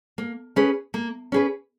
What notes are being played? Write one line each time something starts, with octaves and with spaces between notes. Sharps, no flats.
A#3
C#4 G#4 B4
A#3
C#4 G#4 B4